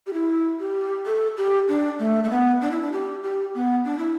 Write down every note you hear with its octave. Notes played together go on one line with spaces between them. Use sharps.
G4
E4
G4
A4
G4
D4
A3
A3
B3
D4
E4
D4
G4
G4
B3
D4
E4